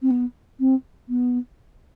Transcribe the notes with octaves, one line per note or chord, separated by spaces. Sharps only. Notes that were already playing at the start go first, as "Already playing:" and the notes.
C4
B3
C4
B3